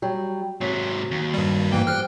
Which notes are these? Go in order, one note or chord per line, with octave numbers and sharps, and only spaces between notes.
F#3 G3
G#2 C3 F#3
D#2
G2 G3
G#2 E3 A#3 G5
F3 G3 F6 F#6